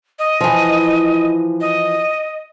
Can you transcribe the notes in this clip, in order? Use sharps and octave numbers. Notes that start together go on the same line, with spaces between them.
D#5
E3 F3
D#5